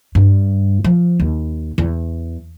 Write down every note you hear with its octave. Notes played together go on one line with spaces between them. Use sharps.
G2
F3
D#2
E2